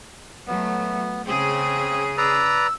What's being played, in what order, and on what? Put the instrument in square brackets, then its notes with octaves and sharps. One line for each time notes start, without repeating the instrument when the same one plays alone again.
[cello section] F#3 A3 [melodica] B3
[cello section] C#3 G#4 [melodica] C4
[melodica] B4 D5 A#5 [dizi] E6